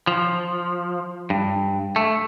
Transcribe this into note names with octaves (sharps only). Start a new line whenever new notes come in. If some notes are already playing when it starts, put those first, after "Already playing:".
F3
G2
A3